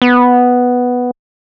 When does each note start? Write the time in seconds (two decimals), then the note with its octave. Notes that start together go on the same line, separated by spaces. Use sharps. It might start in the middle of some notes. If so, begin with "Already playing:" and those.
0.02 B3